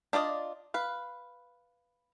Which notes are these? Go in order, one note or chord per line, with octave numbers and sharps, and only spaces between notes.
D4 F4 D5 D#5
B4 F5